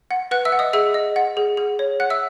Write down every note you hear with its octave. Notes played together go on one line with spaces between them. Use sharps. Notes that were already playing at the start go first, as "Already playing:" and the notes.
F#5
B4 F#5 F#6
E5 E6
F#5
D#5 D#6
G#4 E5 E6
D#5
F#5
G#4
G#4
C#5
F#5 F#6
E5 E6